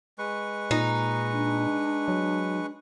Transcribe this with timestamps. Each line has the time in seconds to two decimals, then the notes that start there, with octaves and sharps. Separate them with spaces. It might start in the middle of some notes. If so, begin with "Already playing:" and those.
0.18 G#3 B4 C#6
0.71 A#2 D#4
1.32 D4
2.08 F#3